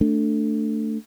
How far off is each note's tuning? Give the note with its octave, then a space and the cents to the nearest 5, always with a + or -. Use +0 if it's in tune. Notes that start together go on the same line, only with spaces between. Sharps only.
A3 +15 D4 +0